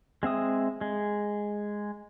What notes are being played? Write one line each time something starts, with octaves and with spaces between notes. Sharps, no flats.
G#3 C4 E5 D#6
G#3